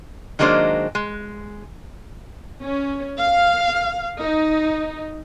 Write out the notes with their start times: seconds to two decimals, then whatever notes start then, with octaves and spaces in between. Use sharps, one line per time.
0.39 D#3 F#3 G#3 A#3 D4 C5
0.95 G#3
2.61 C#4
3.17 F5
4.18 D#4